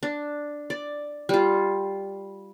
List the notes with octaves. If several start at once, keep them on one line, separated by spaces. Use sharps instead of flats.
D4
D5
G3 F4